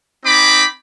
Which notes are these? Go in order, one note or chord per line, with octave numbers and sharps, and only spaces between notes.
C4 D#4 G#5 B5 D6